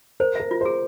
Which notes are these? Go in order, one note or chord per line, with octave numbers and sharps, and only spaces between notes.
A#4 C5
A#4 E5
F4
G#4 C5